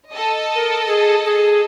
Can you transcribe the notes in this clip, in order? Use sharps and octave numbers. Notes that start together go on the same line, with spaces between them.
A4 D#5
A#4
G#4
G#4